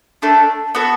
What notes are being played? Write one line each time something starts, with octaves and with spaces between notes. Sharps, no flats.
A3 D4 A4
B3 F#4 A4